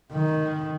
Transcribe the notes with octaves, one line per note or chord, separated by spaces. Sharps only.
D#3